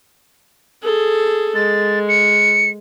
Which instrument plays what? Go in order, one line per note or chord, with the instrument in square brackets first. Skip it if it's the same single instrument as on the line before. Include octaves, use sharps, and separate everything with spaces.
[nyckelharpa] G#4 A4
[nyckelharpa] G#3 [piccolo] A6
[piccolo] C#7